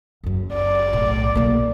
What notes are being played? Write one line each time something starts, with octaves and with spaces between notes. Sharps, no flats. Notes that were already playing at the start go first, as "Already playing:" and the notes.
F#1 F#2
D5
B1 A2
B1 A#3